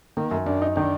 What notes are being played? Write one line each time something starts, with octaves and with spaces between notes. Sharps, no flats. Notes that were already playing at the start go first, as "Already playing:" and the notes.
D#3 A#3
F#2
F#2 D4
D#4
D#3 D4